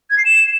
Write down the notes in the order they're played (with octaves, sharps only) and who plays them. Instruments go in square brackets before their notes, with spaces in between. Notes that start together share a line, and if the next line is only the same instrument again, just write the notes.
[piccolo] G#6
C7
E7